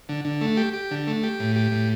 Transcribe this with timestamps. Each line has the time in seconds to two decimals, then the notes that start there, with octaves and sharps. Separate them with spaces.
0.09 D3
0.25 D3
0.41 A3
0.57 G4
0.73 G4
0.91 D3
1.07 A3
1.23 G4
1.40 A2
1.56 G4
1.72 A2